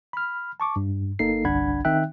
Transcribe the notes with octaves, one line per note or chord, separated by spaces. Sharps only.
B5 F6
A5 C#6 D6
G2
G1 A#3 D#4 A4 C7
G1 C2 D4 F#5 B5 G#6
D#3 C4 D#4 E5 G5 F#6